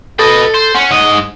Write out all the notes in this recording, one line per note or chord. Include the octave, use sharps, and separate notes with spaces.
A4 B4 D#5
C5
C#4 F#5
G#2 D#5